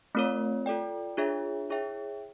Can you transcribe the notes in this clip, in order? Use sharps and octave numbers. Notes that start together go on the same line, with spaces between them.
A3 C4 F4 A#4 C#5
F4 A4 D5 G5
D4 F4 G#4 C#5 E5
E4 G#4 C#5 E5 G5